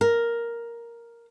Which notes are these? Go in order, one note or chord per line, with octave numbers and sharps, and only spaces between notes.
A#4